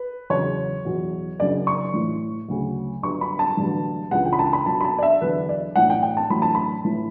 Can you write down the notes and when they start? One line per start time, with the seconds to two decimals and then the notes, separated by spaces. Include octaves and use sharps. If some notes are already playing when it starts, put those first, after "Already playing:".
Already playing: B4
0.30 E2 C#3 F#3 C#5
0.85 E2 B2 F#3
1.39 F#1 F#2 C#3 F#3 D5
1.67 C#6
1.94 A1 A2 E3
2.48 D2 C#3 F#3
3.03 G1 G2 F#3 C#6
3.21 B5
3.39 A5
3.57 A1 G2 D3 F#3
4.11 C#2 C#3 E3 F#5
4.26 G5
4.33 B5
4.39 A5
4.53 B5
4.66 B1 B2 F#3 A5
4.81 B5
4.85 A5
4.98 D5
5.03 E5
5.21 E2 D3 F#3 B4
5.49 D5
5.76 B1 A2 E3 F#5
5.90 G5
6.03 G5
6.17 A5
6.30 A1 A2 F#3 B5
6.42 A5
6.55 B5
6.85 A1 A2 E3